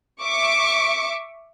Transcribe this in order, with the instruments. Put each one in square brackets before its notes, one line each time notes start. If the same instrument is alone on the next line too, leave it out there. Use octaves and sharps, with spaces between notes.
[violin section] E5 C#6 D6